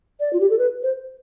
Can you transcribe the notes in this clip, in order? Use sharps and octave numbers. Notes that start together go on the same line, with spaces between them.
D5
F4
G4
A4
B4
C5